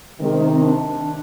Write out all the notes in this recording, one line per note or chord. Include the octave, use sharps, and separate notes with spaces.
C3 D#3 G#3
C4
C4
C4
D4